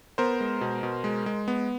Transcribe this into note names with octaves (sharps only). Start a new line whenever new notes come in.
B3 A#4 C5
G#3
B2
B2
G#3
G#3
B3